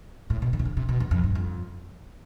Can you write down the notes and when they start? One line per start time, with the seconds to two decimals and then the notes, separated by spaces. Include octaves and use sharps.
0.30 A2
0.42 B2
0.53 D3
0.59 C3
0.65 D3
0.77 C3
0.89 B2
1.00 E2
1.11 F2
1.24 G2
1.35 F2